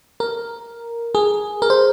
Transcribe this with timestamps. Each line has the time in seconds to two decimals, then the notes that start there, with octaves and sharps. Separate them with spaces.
0.20 A#4
1.15 G#4
1.62 A#4
1.70 C5